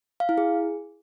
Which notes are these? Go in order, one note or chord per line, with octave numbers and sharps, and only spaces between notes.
F5
E4
G#4